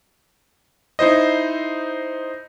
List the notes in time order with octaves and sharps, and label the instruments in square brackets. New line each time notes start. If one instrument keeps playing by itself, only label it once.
[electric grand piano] D#4 E4 C5 D#5